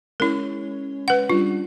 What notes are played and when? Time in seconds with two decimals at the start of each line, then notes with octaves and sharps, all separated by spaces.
0.20 G#3 C#4 E4 A#4 C#5
1.08 B4 F#5
1.30 G3 C#4 D4 F4